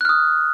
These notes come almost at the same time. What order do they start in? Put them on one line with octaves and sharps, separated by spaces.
F#6 F6 D#6